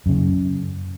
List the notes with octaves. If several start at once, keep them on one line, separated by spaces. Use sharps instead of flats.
F#2 C#3